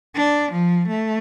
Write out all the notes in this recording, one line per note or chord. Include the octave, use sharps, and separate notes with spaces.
D4
F3
A3